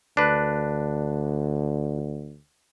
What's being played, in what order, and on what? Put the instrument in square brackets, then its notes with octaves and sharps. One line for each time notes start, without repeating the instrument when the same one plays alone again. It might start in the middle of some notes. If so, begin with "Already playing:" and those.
[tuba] D2 [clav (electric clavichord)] D4 B4